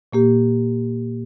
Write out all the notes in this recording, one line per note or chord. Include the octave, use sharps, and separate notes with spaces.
A#2 A#3 G4